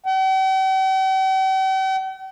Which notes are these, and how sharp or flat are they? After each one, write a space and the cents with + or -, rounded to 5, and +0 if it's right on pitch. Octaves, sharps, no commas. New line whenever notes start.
G5 -45